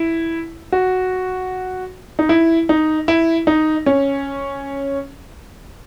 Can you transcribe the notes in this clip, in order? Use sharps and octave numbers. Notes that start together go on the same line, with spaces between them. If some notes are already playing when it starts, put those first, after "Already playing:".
Already playing: E4
F#4
D#4
E4
D#4
E4
D#4
C#4